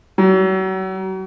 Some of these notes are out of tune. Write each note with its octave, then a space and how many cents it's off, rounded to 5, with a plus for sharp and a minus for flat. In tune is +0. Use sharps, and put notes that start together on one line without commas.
F#3 +35